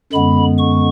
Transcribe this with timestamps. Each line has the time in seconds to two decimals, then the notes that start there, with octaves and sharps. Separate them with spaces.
0.13 F#2 D3 G#3 B3 B5
0.59 C#6